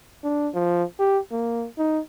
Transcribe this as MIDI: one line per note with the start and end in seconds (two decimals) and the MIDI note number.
0.24 0.49 62
0.54 0.84 53
0.99 1.19 67
1.31 1.66 58
1.78 1.99 63